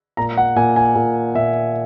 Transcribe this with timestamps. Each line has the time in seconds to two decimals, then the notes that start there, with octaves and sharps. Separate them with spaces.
0.17 A#2 A#5
0.37 F#5
0.56 A#2 G#5
0.76 G#5
0.95 A#2
1.35 A#2 E5